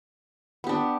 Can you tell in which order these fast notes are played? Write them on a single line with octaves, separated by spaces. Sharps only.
B3 G4 D4